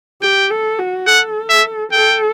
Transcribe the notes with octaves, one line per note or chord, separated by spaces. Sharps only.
G4 G5
A4
F#4
A4 F#5
E5
A4 G5